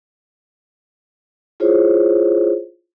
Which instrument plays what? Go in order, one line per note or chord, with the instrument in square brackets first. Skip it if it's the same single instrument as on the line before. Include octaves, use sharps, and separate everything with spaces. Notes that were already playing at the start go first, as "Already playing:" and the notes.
[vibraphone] E4 F4 G#4 C5 C#5